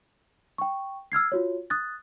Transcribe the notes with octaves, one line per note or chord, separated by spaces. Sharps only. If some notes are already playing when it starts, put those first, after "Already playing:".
G5 C#6
E6 F6 G#6 C7
F4 F#4 C#5
D#6 F#6 A6